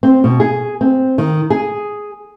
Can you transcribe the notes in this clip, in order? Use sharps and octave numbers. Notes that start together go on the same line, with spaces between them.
C4
B2
G#4
C4
D#3
G#4